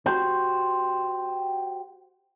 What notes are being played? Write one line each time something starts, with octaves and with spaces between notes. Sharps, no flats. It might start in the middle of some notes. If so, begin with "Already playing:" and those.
F#4 G4 C5